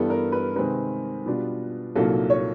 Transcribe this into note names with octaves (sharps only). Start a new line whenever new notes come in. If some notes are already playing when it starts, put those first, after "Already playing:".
Already playing: G2 E3 G3 B3 A4
A#4
B4
C3 D#3 G#3 C4 B4
B2 G3 B3 D4 F4
C2 A#2 F#3 A#3 D#4 A4
C#5